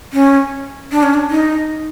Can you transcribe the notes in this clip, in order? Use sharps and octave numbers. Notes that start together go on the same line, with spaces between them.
C#4
D4
C#4
D4
D#4